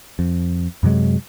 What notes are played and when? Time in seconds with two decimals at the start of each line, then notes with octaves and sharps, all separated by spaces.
0.19 F2
0.83 F#2 C3 F#3 G#3